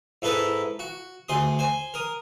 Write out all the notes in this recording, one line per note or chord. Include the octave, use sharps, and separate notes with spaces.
G#2 E4 A4 B4 B5 D#6
F#4
D2 G#4 C6 D#6
C5 G#5
A#4 D#6